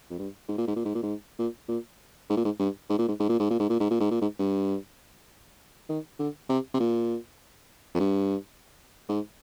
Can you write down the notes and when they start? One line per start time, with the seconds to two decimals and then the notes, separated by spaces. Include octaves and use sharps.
0.10 F2
0.18 G2
0.48 G#2
0.58 A#2
0.67 G#2
0.76 A#2
0.85 G#2
0.94 A#2
1.03 G#2
1.39 A#2
1.68 A#2
2.29 G#2
2.37 A#2
2.45 G#2
2.59 G2
2.89 G#2
2.98 A#2
3.08 G#2
3.20 G#2
3.29 A#2
3.39 G#2
3.50 A#2
3.60 G#2
3.69 A#2
3.79 G#2
3.90 A#2
4.00 G#2
4.10 A#2
4.21 G#2
4.39 G2
5.89 D#3
6.19 D3
6.49 C3
6.74 C3
6.79 A#2
7.94 F2
8.00 G2
9.09 G#2